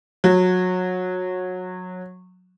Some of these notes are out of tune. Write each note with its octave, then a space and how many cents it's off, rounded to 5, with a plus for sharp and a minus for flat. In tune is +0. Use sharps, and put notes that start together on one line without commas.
F#3 -20